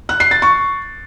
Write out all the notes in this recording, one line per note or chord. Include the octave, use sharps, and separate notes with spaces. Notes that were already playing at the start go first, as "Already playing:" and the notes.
F#6
C7
A6
C#6